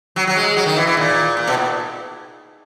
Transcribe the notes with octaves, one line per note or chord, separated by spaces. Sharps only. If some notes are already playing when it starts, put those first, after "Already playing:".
F#3
F#3
G#3
F#3
D#3
E3
E3
A#2
A#2
B2
A#2